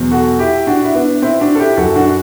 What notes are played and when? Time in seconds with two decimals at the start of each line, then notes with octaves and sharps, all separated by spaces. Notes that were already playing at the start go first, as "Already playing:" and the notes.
Already playing: E2 B2 F#3
0.12 F#4 A4
0.39 E4 G4
0.67 D4 F#4
0.84 E4
0.95 B3 D4
1.22 C4 E4
1.41 D4 F#4
1.55 A4
1.59 E4 G4
1.77 F#2 F#3 F#4 A4
1.96 D4 F#4